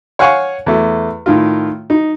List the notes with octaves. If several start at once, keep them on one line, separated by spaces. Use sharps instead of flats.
C#5 F5 F#5 G#5 C#6
E2 A3
A2 D#3 F4
D#4